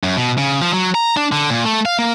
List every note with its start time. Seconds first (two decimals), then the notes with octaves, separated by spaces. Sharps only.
0.03 F#2
0.17 B2
0.38 C#3
0.62 F3
0.73 F#3
0.95 A#5
1.17 D4
1.32 D3
1.50 A#2
1.64 A3
1.86 F5
1.99 A#3